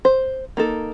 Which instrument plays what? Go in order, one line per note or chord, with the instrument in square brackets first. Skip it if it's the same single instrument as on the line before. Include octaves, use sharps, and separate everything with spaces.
[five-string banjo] C5
A#3 D#4 A4